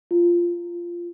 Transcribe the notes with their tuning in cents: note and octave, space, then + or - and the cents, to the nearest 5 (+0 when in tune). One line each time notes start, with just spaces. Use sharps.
F4 -10